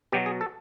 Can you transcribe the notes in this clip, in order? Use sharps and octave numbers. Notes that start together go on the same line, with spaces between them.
B2 F#3 G4
G#4
A4